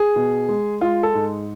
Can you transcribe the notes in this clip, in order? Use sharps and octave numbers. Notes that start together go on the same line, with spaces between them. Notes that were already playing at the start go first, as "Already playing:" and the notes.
Already playing: G#4
B2
G#3
G#3 F4
A4
G#2